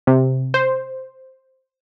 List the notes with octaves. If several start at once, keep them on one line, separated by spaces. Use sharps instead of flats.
C3
C5